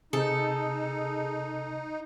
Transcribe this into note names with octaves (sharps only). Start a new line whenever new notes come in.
C3 D#4 G#4 A4